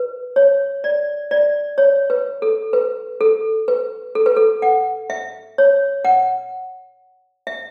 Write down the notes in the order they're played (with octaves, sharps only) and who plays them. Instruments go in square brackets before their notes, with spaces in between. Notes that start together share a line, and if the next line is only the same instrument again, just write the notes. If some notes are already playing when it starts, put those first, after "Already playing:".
Already playing: [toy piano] B4
C#5
D5
D5
C#5
B4
A4
B4
A4
B4
A4
B4
A4
F#5
E5
C#5
F#5
E5